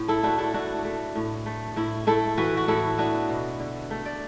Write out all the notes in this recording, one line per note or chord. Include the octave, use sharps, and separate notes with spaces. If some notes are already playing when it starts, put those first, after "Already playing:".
Already playing: A2
E4 A4
A3 D4 F#4
E4 A4
A3 D4 F#4
A3
A2
A3
A2 E4
A3 E4 A4
E3 F#4 B4
F#4
A2 E4 A4
B3 D4 F#4
B2
D3
A3
D5